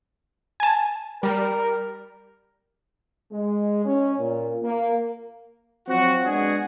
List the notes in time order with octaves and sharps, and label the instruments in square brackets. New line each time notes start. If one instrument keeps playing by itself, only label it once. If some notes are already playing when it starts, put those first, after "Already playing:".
[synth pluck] G#5 A5
[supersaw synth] G3 [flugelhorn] A#4
[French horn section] G#3
C#4
A#2
A#3
[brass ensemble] F3 F#3 C4 F#4
G#3 B3 D4 F#4 G#4